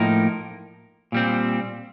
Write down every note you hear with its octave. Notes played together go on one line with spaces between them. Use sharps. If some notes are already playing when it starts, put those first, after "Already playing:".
Already playing: A2 F3 A#3 D#4 A#4
A#2 G3 C4